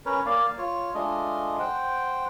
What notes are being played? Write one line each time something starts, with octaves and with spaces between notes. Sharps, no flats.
C#4 A#4 B4 C#5
A#3 D5 F5
F4 C#5
G#3 A3 D4 F4 D#5
C5 F#5 G5